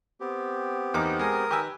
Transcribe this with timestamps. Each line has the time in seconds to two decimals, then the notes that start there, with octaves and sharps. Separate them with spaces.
0.20 B3 C4 G4
0.94 E2 A#3 D#4 D6
1.19 G#3 A#4 D#6
1.51 D#3 G4 B4 G#5 E6